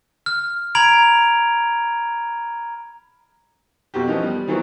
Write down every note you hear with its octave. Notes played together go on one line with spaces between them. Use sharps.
F6
A#5 B5 G#6 D7 F7
F2 B2 F#4 G4
E3 F3 A#3 B3 C#4 D#4
G3
D#3 E3 F#3 B3 C4